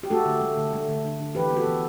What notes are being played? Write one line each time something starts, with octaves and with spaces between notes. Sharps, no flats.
G4
A3 F#4 A4
D3
A3
D3
A3
D3
D3
D3
E3 G4 B4
B3
F#4 A4
E3